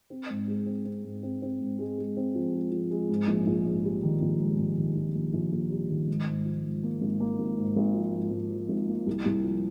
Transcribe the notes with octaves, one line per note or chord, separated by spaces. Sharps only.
C4
G#2
G#3
C4
C4
G#2
C4
C4
G#2
G#3
G#3
C4
F3
G#3
F3
G#3
G#2
A#1
A#1
G#2
G3
D#3
A#1
G#2
A#1
D#3
A#1
A#1
A#1
A#1
G3
D#3
G#2
G#2
F3
G#2
A#3
G#1
A#3
G#1
G#2
G#1
F3
G#2
G#1
F3
G#1
A#3
C2
C2
F3